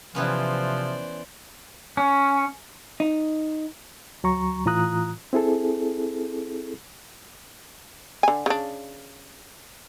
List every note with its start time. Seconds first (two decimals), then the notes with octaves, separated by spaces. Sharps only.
0.15 C3 E3 F3 B3 C#4 C5 D5
1.97 C#4
3.00 D#4
4.23 D2 F#3 A#5 C#6
4.66 A2 E3 F4 A#5 D#6 F#6
5.33 C4 E4 G#4 A4
8.23 D3 G#5
8.46 C#3 D4